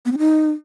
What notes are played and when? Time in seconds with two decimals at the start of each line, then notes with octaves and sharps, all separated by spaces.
0.05 B3
0.12 C4
0.18 D#4